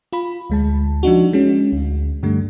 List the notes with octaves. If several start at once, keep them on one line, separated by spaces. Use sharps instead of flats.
F4 B5
D2 G#3 A5
F3 D4 D#4 F#4
G#3 C#4
D2
G2 D3 G3 A3